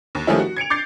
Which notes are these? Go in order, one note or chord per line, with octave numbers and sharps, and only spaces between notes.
D#2
D#3 F3 G3 A3 C#4 E4
F#4
G#6 C#7 D7 F7
D6 G6 A6 C7